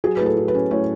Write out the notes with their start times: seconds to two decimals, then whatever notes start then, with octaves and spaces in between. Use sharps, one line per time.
0.04 F#3 G#4
0.17 A2 B4
0.26 A4
0.37 F#3
0.48 B4
0.55 C#4
0.71 A2 C#5